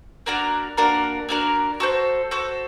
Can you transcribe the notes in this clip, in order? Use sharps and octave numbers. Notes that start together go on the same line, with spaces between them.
A#3 D4 F#4 A#4
A#3 D4 F#4 A#4
A#3 D4 F#4 A#4
F#4 A4 C5
F#4 A4 C5